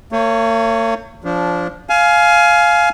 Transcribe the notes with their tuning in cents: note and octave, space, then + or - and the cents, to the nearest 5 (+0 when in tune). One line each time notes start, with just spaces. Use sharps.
A#3 -45 C#5 +0
F3 +0 D4 -20
F5 +0 G#5 +25